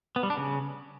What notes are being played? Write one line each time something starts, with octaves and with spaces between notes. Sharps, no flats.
B3
G3
D4
C#3